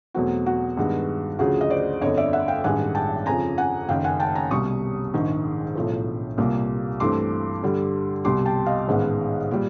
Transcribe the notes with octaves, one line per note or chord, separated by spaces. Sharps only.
E2 B2 F#3 A3 C4 F#4
F#4
G2 D#3 G#3 B3
D2 C#3 F3 F#4 G#4
D#5
C5 D5
G1 F2 D3 C#5 D#5
D5 E5
E5 F#5
F5 G5
A1 G2 D#3 G#3 F#5 G#5
G5 A5
F2 C#3 F3 G#5 A#5
F#5 G#5
F#1 F#2 D#3 F5 G5
F#5 G#5
G5 A5
G#5 A#5
C2 B2 G3 C#6 D#6
A#1 G#2 D#3 G#3
B1 A2 F3
C2 A#2 G3 A#3
G2 E3 A3 C4 C6 D6
G2 D3 G3
C2 B2 G3 C6 D6
G5 A5
D#5 F5
A1 G#2 D#3 G#3 B3
A#2 G3